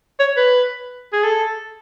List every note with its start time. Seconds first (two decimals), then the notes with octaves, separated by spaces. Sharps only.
0.20 C#5
0.37 B4
1.13 G#4
1.24 A4